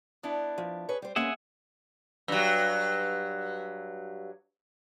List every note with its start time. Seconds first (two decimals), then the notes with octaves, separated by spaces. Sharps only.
0.23 B3 D4 E4
0.58 F3
0.89 G#4 B4 C#5
1.02 G3 C5
1.16 G#3 A#3 B3 C#4 G#4 E5 F#5
2.28 G2 F#3